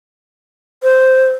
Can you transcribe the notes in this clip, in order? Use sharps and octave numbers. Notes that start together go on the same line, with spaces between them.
C5